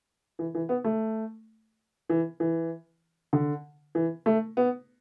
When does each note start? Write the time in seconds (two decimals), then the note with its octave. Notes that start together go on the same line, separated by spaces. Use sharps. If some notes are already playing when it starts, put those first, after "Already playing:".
0.39 E3
0.55 E3
0.69 B3
0.84 A3
2.09 E3
2.40 E3
3.33 D3
3.95 E3
4.26 A3
4.57 B3